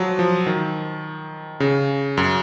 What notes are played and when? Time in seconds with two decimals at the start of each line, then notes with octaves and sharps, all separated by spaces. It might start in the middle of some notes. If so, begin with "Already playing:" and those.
Already playing: F3 F#3
0.19 F3
0.47 D#3
1.60 C#3
2.17 F#2